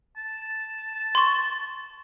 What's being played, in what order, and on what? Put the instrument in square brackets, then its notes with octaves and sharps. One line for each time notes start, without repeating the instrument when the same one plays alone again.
[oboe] A5
[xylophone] C6 C#6